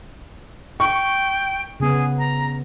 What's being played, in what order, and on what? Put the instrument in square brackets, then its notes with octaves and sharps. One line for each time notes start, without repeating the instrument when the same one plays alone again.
[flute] G5 [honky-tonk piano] C#6
[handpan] C#3 B3 [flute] G#4
[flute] A#5